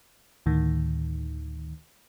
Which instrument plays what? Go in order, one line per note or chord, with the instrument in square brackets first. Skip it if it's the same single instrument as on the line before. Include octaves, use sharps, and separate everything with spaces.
[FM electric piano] D2 A2 D#3